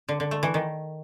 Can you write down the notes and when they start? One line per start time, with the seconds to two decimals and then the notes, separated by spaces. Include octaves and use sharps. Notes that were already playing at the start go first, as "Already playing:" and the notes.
0.09 D3
0.20 D3
0.31 A3
0.43 E3
0.54 D#3